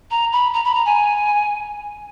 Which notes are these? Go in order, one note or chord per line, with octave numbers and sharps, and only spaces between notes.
A#5
B5
A#5
B5
A#5
G#5